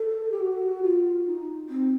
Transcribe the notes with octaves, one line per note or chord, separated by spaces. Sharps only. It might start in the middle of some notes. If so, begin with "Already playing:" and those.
Already playing: A4
G4
F#4
F4
D#4
C4